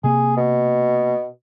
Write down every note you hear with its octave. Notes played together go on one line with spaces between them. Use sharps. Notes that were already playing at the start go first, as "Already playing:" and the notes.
C3 A#3 G#4
B2